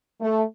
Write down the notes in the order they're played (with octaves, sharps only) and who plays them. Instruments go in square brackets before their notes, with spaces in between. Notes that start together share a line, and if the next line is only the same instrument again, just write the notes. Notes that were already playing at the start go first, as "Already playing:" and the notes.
[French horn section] A3